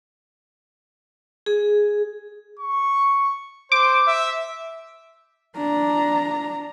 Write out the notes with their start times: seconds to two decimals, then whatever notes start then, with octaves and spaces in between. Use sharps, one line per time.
1.46 G#4
2.59 C#6
3.72 C5 D6
4.07 E5
5.57 D4 A#5